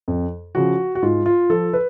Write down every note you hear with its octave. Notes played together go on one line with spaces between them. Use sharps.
F2
C#3 F3 F#4
F#4
G#2 F4
F4
F3 A4
B4